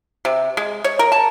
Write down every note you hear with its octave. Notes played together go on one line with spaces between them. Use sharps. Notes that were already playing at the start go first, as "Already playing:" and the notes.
C3
G#3
C#5
A#4
A5